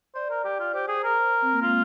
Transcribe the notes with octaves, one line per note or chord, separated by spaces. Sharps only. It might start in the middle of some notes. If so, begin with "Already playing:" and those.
C5 D5
A#4
G4
F4
G4 C5
G#4
A#4
C4
A#3
G#3 F4